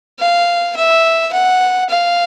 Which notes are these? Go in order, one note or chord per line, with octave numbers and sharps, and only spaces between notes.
F5
E5
F#5
F5